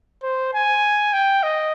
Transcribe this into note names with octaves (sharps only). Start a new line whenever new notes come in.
C5
G#5
G5
D#5